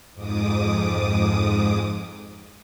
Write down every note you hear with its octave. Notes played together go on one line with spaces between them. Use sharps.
F2 G#2 D6 D#6